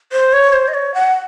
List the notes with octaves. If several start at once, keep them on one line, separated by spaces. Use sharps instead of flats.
C5
C#5
C5
D#5
C#5
F#5